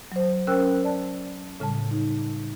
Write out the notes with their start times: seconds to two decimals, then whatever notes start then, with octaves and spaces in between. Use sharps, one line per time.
0.12 F#3 C5
0.47 C#4 A#4 C5 G5 E6 F#6
0.84 D5 A5
1.60 A2 C#3 G3 A5
1.91 D#4